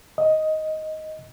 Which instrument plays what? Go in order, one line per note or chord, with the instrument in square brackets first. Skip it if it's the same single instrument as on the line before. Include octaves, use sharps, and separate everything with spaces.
[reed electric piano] D#5